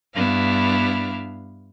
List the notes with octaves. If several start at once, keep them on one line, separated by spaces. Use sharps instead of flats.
G2 B3 D4 E4 F5